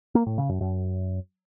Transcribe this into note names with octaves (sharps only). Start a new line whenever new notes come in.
A#3
A2
C#3
F#2
F#2